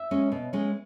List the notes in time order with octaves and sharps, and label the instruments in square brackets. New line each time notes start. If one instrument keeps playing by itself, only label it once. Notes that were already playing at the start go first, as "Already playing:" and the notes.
Already playing: [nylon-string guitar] E5
G#3 C#4
B2
G#3 C#4